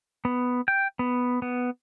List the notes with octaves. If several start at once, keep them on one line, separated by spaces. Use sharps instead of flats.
B3
G5
B3
B3